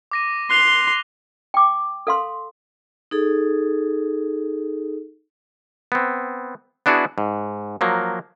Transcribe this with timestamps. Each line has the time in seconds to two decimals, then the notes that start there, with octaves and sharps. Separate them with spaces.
0.11 D6 A#6 D#7
0.51 C6 F#6 F7 G7
1.54 G5 D6
2.07 A4 F5 C6
3.11 D#4 G#4 A4
5.92 B3 C4
6.86 B3 D4 E4 F#4 G#4
7.18 G#2
7.81 F3 F#3 A#3